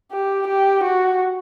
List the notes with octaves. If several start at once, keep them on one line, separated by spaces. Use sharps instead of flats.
G4
G4
F#4